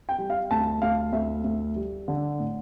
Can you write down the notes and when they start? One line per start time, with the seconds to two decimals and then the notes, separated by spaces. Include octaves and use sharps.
0.09 G5
0.18 G3
0.30 F5
0.51 D2 A5
0.82 D2 F5
1.13 D2 E5
1.44 D2
1.76 G3
2.08 D3
2.39 A2